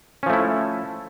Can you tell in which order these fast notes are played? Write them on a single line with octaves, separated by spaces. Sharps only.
C#4 F3 A3 E4